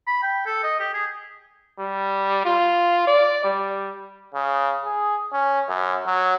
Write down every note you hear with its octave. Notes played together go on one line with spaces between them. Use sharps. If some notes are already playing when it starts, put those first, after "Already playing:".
B5
G5
A4
D#5
G4
G#4
G3
F4
D5
G3
C#3
G#4
C#4
F#2
F#3